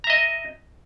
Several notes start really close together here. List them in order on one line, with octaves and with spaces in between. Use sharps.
A#5 E5 D#5